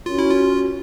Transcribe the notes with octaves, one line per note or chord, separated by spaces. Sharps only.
C#4 F4 F#4 A#4 C#5
E4
F4